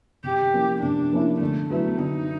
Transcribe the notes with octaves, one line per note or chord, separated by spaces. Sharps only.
C3 G4
F3 A#3 C#4 E4
C3 D4
F3 A#3 C#4 E4
D3 A3
F#3 A3 B3 E4
D3 D#4